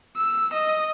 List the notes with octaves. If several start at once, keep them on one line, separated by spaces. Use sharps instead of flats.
E6
D#5